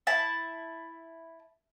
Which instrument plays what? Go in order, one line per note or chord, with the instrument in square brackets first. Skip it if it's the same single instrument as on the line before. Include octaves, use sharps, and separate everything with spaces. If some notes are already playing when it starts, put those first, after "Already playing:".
[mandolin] E4 A5